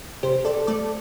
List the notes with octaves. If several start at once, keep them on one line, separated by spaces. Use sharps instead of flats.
C3 G4 C5
A4 D5
A3 A4 D5